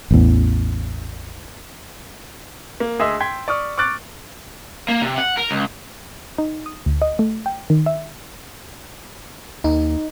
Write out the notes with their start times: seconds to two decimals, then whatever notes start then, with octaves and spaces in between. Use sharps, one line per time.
0.11 A1 E2
2.80 A#3
2.99 D2 G#4 D#5 E5 C6 E6
3.20 G5 C6 G#6 B6
3.48 D5 C#6 D#6 F6
3.78 C#6 D6 F6 F#6 A6 D7
4.88 A#3
5.02 C3
5.18 F#5
5.37 A#4
5.51 C#2
6.38 D#4
6.66 D#6
6.86 D2
7.02 D#5
7.19 A3
7.46 G5
7.70 D#3
7.86 E5
9.64 D#2 D#4